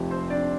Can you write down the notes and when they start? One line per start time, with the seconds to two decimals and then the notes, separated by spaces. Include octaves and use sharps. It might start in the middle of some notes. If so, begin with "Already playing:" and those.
Already playing: F1 F2 F3 G4
0.11 C4 C5
0.30 D4 D5